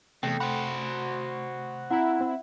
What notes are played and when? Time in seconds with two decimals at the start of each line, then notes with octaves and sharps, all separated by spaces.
0.23 E2 C3 A3 A4 G5
0.40 F#4 C5 B5
1.90 C4 E4 F#5 A#5 B5
2.21 C4